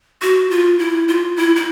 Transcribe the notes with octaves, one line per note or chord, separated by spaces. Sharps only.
F#4
F4
E4
F4
E4
E4